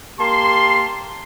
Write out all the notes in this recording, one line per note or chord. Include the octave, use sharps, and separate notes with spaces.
A#3 G4 A5 C6